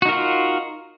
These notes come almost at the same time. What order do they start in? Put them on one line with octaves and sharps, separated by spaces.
F#4 D#4 A#4 F4